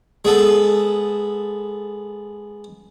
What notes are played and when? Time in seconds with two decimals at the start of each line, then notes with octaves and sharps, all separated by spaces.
0.25 G#3 B3 A4